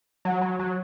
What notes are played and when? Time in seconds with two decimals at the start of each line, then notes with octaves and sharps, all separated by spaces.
0.25 F#3
0.41 F#3
0.59 F#3